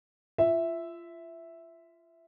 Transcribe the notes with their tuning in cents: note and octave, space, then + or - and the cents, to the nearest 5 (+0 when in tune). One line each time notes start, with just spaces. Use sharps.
F4 -30 E5 +0